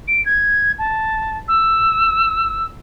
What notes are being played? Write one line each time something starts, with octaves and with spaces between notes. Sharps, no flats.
D7
G#6
A5
E6